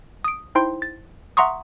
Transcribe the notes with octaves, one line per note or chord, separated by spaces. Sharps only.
D#6 D7
D#4 E4 C5 G5 C6
A6
E5 F#5 A#5 C6 C#6 D#6